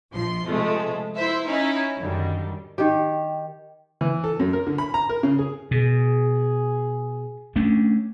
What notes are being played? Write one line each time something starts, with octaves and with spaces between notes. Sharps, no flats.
A#1 F3 C6
C3 F3 G#3 A3
E4 C5 E5
C#4 D#4 E4
F#2 D3 D#3 G3
D#3 G4
E3
A4
F#2
A#4
D3
B5
A#5
A#4
C#3
G#4
B2 G#4
A3 C#4 D4